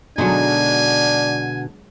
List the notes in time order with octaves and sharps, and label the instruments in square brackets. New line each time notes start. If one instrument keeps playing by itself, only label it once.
[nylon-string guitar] B2 D3 [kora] F#3 G#3 D#4 [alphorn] D4 [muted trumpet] G#5